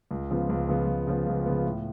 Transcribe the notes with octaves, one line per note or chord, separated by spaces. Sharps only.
C#2
C#3 F3 B3
C#2
C#3 F3 B3
C#2
C#3 F3 B3
C#2
C#3 F3 B3
A2